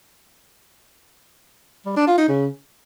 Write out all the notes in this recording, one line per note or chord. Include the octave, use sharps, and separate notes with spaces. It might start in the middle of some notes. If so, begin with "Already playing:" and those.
G3
D4
F4
D#4
C#3